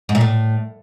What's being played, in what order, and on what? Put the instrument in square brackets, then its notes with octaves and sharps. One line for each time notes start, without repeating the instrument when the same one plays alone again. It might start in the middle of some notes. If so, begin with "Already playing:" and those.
[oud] G#2
A#2
A2